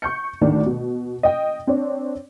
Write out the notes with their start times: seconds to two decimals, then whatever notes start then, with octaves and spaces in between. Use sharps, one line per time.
0.02 C#6 G6 C#7
0.41 D2 A2 D#3 A3 D4
0.66 B2
1.23 D#5 G5
1.67 C4 D4 C#5